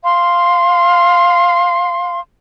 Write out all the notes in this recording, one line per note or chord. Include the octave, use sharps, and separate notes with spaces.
F5 C6